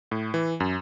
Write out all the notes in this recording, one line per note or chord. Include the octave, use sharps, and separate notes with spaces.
A2
E3
F#2